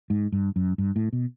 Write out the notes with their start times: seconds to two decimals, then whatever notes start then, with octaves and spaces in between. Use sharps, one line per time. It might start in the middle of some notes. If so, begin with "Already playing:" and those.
0.10 G#2
0.32 G2
0.56 F#2
0.78 G2
0.96 A2
1.13 B2